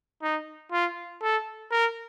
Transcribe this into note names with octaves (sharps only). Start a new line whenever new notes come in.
D#4
F4
A4
A#4